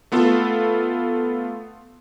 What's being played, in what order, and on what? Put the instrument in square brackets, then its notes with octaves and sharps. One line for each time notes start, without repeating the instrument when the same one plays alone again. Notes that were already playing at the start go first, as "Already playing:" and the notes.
[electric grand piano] A3 B3 F4 A4